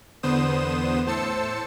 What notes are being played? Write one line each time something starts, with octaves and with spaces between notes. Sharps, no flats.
E2 D3 B3 C5 D#6 E7
A2 C5 A5 E6 C#7